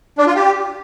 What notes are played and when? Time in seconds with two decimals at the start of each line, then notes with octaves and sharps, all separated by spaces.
0.18 D4
0.27 F4
0.35 G4